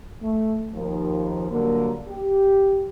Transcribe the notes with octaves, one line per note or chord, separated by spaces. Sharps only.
A3
D#2 F3
D3 F#3 G3 A#3
G4